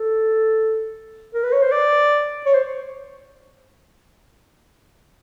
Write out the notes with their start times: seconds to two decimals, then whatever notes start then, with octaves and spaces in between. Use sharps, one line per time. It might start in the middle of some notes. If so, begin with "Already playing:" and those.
Already playing: A4
1.34 A#4
1.44 B4
1.53 C#5
1.62 C5
1.72 D5
2.46 C#5
2.54 C5